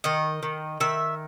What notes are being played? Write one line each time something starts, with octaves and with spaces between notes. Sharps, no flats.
D#3 D#5
D#3
D#3 E5